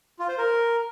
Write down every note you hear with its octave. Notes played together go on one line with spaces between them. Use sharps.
F4
C5
A#4